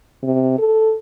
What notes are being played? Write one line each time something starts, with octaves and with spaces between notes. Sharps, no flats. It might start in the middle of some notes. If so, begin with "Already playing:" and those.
C3
A4